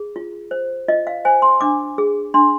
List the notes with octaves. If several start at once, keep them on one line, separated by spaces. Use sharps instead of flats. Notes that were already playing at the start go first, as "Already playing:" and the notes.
Already playing: G#4
F4
C5
F4 D#5
F5
C5 G#5
C6
D4 D6
G#4
D4 C6